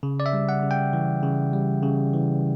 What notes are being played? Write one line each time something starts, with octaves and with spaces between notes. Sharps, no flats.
C#3
D5
E5
G3
F#5
C#3
G5
E3
C#3
G3
C#3
E3